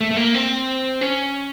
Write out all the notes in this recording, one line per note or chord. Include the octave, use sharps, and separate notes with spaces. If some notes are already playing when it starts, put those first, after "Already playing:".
A3
A3
A#3
C4
C#4